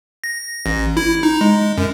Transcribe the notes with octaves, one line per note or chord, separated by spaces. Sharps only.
A#6
A1
E4
D#4
G#3
F#2